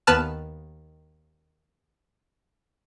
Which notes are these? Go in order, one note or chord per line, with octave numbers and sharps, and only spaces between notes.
D#2 B3 B4 A5 F6